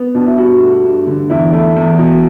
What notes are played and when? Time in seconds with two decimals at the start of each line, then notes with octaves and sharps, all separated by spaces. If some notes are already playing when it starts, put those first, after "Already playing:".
Already playing: B3
0.15 B2 D4
0.26 E4
0.38 G2 F#4
0.61 A3
0.84 G2
1.07 D3
1.30 E2 E4
1.53 A3
1.76 E2
1.99 B2